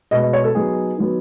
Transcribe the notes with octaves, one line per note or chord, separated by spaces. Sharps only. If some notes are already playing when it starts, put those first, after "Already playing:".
B2 G#3 B3 D#5
D#5
C#5
A4
F#3 B3 D#4 G#4
D#3 F#3 B3